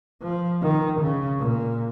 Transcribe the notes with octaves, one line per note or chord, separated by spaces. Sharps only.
F3
D#3
C#3
A#2